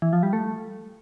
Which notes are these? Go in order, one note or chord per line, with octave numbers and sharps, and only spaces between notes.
E3
F3
G3
A3